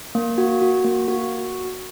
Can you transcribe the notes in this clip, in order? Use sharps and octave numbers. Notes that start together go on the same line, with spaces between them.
A#3
F#4
F#4
A#3
F#4